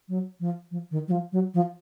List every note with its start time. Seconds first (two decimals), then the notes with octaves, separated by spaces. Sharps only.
0.09 F#3
0.40 F3
0.71 F3
0.91 D#3
1.08 F#3
1.11 F3
1.32 F#3
1.54 F3